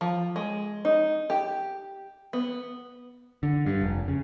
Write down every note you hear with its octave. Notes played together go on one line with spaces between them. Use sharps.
F3
G#3
D#4
G4
B3
D3
G2
F1
C#3